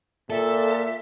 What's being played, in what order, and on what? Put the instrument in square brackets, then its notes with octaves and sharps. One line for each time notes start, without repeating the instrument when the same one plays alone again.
[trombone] A#2 [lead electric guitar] A4 [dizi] E5